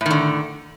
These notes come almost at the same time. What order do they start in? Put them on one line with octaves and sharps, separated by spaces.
A2 D#3 D3